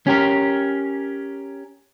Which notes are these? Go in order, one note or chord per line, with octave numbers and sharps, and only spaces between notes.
C#4 G4 A#4